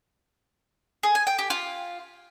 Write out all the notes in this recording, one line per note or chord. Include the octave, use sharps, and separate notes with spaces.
G#4
G#5
G5
G4
F4